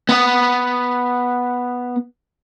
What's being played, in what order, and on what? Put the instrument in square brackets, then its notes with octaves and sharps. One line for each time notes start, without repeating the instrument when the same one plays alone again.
[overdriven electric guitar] B3